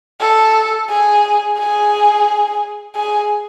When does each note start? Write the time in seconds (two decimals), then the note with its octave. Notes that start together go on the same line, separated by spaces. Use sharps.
0.20 A4
0.89 G#4
1.58 G#4
2.95 G#4